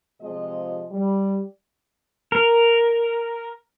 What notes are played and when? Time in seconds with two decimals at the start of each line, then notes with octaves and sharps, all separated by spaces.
0.21 C3 F3 G#3 F4 G#4 D#5
0.91 G3
2.32 A#4